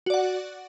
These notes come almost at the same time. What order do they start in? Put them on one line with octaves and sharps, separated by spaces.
F#4 D5 F#5